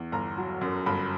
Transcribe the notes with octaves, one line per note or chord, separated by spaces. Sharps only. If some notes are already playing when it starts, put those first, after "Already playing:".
Already playing: E2
G1 A#5
F#3
F#2
G1 B5